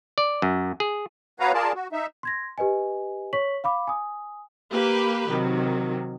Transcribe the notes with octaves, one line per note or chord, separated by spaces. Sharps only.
D5
F#2
G#4
B3 F#4 B4 C#5 F5 A#5
F4 G#4 A#4 D5 A5
F#4
D#4 E5
C6 G#6 A#6
G4 B4 D#5 G#5
C#5 C#6 B6 F#7
F5 B5 D6
G#5 D#6
A#3 G4 B4
C3 D#3 F#3